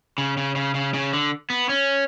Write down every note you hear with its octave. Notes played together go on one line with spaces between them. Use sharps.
C#3
C#3
C#3
C#3
C#3
D3
B3
C#4